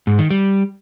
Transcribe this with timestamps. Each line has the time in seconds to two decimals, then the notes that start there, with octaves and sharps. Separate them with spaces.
0.07 G#2
0.19 D#3
0.30 G3